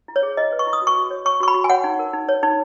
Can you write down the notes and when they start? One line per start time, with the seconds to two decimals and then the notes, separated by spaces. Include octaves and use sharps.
0.08 E4
0.16 C#5
0.23 G#4
0.37 E4 D#5
0.52 B4
0.59 C#6
0.67 E4
0.73 D#6
0.82 F#4
0.87 C#6
0.96 F#4
1.11 C#5
1.25 C#5 C#6
1.40 F#4 C#6
1.48 B5
1.54 F#4
1.64 G#5
1.70 C#5 F#5
1.84 D#4
1.99 A#4
2.13 D#4
2.29 C#5
2.43 D#4